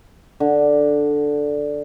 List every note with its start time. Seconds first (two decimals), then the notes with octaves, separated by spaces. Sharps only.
0.40 D3